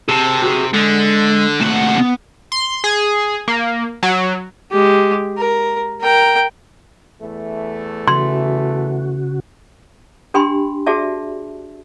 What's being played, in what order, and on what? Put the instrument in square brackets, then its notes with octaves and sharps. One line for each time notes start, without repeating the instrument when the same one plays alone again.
[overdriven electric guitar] C3 [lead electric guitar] G#4 A5
[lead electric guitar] F#4 G#4
[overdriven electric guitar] D3 [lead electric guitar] G#3
[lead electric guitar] D#2 A3 [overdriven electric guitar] C3 F#5
[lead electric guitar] B3
[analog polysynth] C6
G#4
A#3
F#3
[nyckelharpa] G#3 G4
A#4
A#4 G5
[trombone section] E2 E3 A3
[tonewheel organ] C#3 F#4 [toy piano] C6
[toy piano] D4 G4 G5 G#5 B5 C6
F#4 G#4 D5 E5 A5